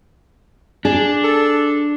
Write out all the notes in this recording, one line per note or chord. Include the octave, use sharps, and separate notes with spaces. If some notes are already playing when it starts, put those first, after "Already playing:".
D4 G#4
A4